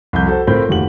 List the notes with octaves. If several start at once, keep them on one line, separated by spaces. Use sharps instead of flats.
C2 F2 G6
F#4 A4 C5
A2 C4 F4 A#4 B5 G6
F1 D#2 F#4 G4 F#7